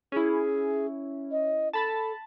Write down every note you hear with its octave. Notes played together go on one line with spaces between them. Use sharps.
C#4 E4 G#4
D#5
A4 A5 B5 A6